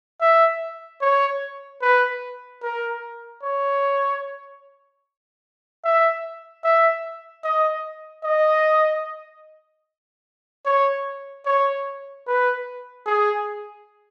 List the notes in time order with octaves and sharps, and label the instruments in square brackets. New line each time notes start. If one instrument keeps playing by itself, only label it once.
[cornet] E5
C#5
B4
A#4
C#5
E5
E5
D#5
D#5
C#5
C#5
B4
G#4